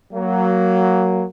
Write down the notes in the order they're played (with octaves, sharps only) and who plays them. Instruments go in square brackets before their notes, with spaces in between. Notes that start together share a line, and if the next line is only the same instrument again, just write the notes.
[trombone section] F#3 A#3